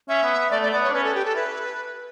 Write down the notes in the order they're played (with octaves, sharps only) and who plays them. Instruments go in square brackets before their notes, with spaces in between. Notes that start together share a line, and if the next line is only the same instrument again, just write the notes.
[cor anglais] C#4 [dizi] E5
[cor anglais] B3
B3
[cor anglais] A3 [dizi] D5
[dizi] D5
[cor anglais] A3
[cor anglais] B3 [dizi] D5
[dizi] C#5
[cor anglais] D4
[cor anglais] C#4 [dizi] B4
[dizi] A4
G4
A4
[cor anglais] E4 [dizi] B4